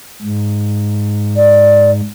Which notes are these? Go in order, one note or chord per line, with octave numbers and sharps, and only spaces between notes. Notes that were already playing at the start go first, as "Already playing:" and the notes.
G#2
D5